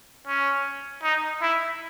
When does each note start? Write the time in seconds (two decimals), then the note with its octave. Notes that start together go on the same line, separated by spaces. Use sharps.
0.27 C#4
1.03 D#4
1.42 E4